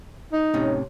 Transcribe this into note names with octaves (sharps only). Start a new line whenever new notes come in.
D#4
A2 C3 C#4